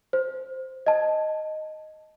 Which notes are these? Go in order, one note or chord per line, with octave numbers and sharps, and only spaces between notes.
C5
D#5 A5